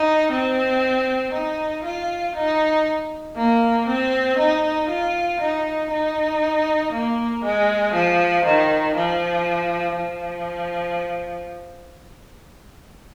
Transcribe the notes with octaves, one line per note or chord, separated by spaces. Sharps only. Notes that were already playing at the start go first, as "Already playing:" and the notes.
Already playing: D#4
C4
D#4
F4
D#4
A#3
C4
D#4
F4
D#4
D#4
A#3
G#3
F3
D#3
F3
F3